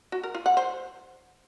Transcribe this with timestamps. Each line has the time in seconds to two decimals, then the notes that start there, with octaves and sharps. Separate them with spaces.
0.12 F#4
0.23 A#4
0.35 F4
0.46 F#5
0.57 C5